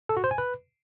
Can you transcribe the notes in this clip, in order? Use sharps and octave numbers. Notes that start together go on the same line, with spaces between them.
A4
F#4
C5
G#5
B4